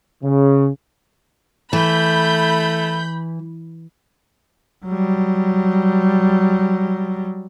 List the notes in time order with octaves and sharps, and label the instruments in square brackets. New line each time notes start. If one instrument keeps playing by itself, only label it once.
[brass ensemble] C#3
[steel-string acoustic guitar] E3 [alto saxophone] A3 [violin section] B5 G6
[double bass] F#3 G3